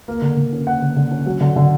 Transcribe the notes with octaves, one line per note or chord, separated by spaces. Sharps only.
A#3
D3
D3
C#4
A#3 F#5
D3
D3
C#4
F#3
D3
D3